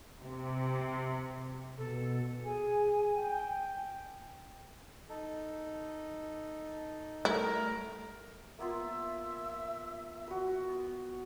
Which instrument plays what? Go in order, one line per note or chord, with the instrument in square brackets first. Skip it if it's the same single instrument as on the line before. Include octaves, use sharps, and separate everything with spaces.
[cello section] C3
[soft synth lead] B2 [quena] A4
[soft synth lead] G#4 [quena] G#5
[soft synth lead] G5
[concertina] D#4 A4
[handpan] G3 A3 [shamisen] E4 [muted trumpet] A#4
[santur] A#3 B3 F4 [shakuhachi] E5
[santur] F#4 B4
B3